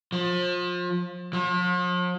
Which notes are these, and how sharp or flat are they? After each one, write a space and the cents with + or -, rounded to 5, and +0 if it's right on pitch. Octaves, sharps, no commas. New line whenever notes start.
F3 +30
F3 +45